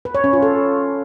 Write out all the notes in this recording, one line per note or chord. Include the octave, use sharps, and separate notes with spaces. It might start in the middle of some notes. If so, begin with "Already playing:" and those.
B4
C#5
C#4
F4
A4